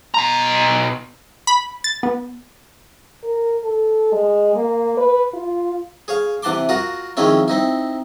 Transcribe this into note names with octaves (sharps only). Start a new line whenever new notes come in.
B2 A#5
B5
A6
B3
A#4
A4
G#3
A#3
B4
F4
G#4 C#5 F5
C3 E3 F#5 A5 C6 D6
F4 F#4 A#4 F#5 D#6
D#3 F3 G#3 C4 C#4 E4
C4 D#4 E4